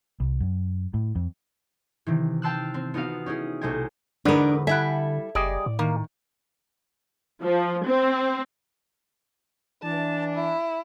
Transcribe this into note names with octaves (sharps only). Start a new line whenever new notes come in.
C2
F#2
A2
F2
C3 D#3 E3
F5 G5 A5 C6 E6 F#6
C4
B3 D#4 F4 F#4 F5
C#4 D#4 E4 G#4
B1 C3 A3 C5 D#5 G#5
E2 G#2 D3 B3 D4 D#4 A#4 B4
G3 E4 A4 E5 F#5 G#5
F#1 G3 G#4 D5 D#5
A2
D#3 A#3
F3
C4
E3 D4 A5
E4